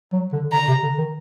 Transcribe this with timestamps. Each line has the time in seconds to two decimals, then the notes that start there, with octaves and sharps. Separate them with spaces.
0.12 F#3
0.33 D3
0.52 D3 A#5
0.68 C3
0.83 D3
0.98 D#3